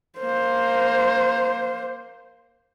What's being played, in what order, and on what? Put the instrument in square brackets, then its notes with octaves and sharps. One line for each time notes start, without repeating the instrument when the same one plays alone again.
[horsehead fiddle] A#3 C5